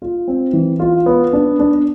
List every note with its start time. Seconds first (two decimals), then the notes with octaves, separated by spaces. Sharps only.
0.02 F4
0.28 C4
0.53 E3
0.80 F4
1.06 B3
1.33 D4
1.59 D4